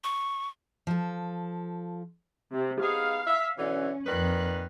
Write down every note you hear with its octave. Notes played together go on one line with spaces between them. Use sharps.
C#6
F3 A4
C3
B3 D#4 G#4 F5
E5
B2 D3 E3 C#4
F2 A#2 D#3 B4 F#6